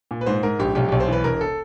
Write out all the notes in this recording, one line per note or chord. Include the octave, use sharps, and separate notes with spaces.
A#2
B4
G#2 C5
G#2 A#4
A#1 G4
B1 G4
B1 G4
C5
E3 B4
E1 A#4
A4